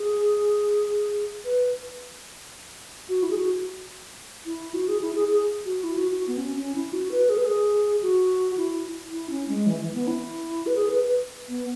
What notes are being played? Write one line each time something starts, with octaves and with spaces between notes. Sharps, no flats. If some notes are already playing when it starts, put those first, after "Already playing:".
Already playing: G#4
B4
F#4
E4
G#4
F#4
E4
F#4
G#4
E4
G#4
G#4
F#4
E4
F#4
F#4
B3
C#4
C#4
E4
F#4
B4
G#4
B4
G#4
F#4
E4
E4
C#4
G#3
E3
E3
B3
E4
B4
G#4
B4
B4
B3